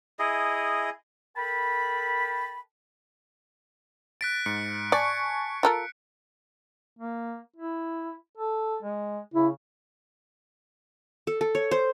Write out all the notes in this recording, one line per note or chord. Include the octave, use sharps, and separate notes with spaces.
E4 G#4 D#5
A4 A#4 G5 A5 B5
F#6 A6 B6 D7
G#2 C#7
D5 G#5 A5 C#6 C#7
F4 A4 A#4
A#3
E4
A4
G#3
C#3 E4
A4
A4
C#5
C5